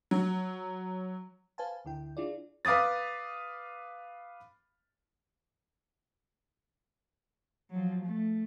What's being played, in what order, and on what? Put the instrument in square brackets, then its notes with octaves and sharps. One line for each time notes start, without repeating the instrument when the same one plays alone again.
[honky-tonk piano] F#3
[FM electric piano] B4 C5 F5 G#5 A5
D2 D3 E4 G5
D4 E4 F4 G#4 D5
[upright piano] B4 F5 D6 D#6 A6
[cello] F3 F#3
A3